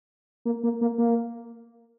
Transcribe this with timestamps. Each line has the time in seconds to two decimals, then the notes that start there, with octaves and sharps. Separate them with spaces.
0.45 A#3
0.63 A#3
0.81 A#3
0.98 A#3